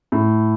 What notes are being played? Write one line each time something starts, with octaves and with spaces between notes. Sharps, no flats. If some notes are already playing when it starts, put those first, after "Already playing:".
A2